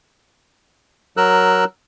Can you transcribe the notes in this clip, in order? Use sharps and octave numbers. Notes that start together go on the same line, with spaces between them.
F#3 A#4 E6 F#6